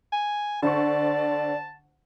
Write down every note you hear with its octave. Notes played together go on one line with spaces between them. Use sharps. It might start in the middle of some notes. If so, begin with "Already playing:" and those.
G#5
D3 C5 D5 A5 C#6